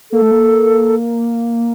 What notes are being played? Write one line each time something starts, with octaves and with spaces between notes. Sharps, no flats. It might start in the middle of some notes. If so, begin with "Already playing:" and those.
A#3 A4
A3
A#3